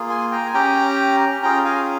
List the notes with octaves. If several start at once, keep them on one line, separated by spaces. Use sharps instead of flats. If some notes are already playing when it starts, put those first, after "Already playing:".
Already playing: A#3 F4 G#4
G#5 C6
G5 A#5
G#5
C#4 G4 G5 A#5
C#4 F4 G#4 G5 A#5
F5 G#5